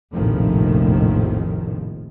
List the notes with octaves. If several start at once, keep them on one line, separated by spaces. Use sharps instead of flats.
F1 A#1 A2 D#3 F3